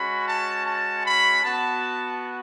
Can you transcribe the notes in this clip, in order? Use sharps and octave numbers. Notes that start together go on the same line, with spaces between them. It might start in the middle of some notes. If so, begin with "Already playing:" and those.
Already playing: G#3 C#4 F#4 B5
A5
A5
B5
B3 F#4 A5